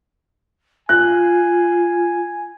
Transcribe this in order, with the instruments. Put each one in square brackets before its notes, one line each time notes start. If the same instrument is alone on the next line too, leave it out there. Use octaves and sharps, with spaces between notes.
[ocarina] F4 [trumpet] G#5 [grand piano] F#6